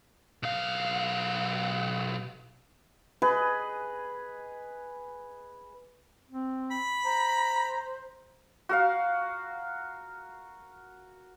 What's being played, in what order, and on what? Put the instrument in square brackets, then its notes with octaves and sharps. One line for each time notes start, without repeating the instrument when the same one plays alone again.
[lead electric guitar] B1 F5
[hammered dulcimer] G#4 B4 D#5
[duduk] C4
[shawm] B5
[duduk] C5 [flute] A#5
[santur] F#4 A#4 F5